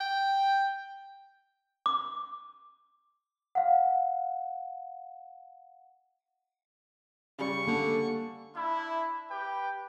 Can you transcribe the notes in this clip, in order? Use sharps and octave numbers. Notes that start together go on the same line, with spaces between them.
G5
D6
F5 F#5
C#3 G3 C#6
D3 A#3
D4 E4
G4 B4 G5